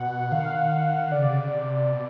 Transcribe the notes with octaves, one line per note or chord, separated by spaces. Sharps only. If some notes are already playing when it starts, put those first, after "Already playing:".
Already playing: B2 F#5
D#3 F5
D3 D5
C#3
C3
C#3
C3
B2